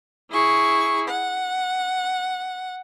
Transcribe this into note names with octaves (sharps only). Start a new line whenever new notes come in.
E4 G#4 C#6
F#5